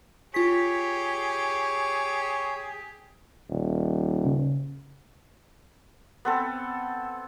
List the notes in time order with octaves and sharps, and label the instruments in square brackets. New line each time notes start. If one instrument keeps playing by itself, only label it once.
[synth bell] F4 B6 [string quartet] G4 [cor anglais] G#4 [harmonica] C#5
[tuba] D#1
[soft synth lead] C#3
[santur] B3 C4 A4